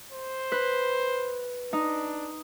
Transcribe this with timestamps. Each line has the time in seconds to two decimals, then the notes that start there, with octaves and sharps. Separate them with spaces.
0.12 C5
0.52 B4
1.73 D4 D#4